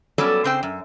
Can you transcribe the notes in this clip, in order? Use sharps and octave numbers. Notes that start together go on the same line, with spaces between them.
F#3 G3 B3 C#4 A4 D5
C#3 C4 C5 G5
F#2